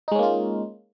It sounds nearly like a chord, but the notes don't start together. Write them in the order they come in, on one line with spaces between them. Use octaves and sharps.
D#4 G#3 C#4 A#3 F4